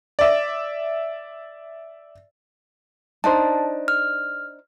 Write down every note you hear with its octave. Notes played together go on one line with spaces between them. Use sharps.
D5 E5
D4 D#4 C5 A5
F6